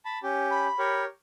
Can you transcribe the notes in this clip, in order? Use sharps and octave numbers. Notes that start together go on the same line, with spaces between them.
A5 B5
C#4 G4
B5
G4 A#4 C#5